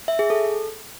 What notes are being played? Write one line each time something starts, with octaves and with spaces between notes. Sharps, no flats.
E5
G#4
A4